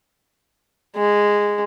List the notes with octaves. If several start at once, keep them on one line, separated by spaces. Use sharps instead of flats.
G#3